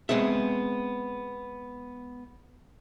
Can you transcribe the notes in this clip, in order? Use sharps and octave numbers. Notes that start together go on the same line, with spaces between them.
G#3 B3 C4 G#4 E5